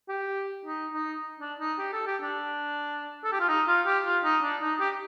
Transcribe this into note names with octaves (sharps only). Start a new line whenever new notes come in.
G4
D#4
D#4
D4
D#4
G4
A4
G4
D4
A4
G4
F4
D#4
F4
G4
F4
D#4
D4
D#4
G4